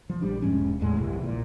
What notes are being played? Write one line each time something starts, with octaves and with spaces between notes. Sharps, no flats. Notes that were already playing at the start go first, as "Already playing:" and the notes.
F3
A#1 G3 D4
E1 G#2 C#4
F1 E2 A2 G#3
G1 C2 E3
A#1 A#2